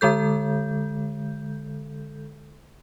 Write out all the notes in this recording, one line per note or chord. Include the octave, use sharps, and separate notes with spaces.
D3 G#3 A4 G6